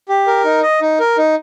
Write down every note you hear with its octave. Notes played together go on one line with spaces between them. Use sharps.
G4
A#4
D#4
D#5
D#4
A#4
D#4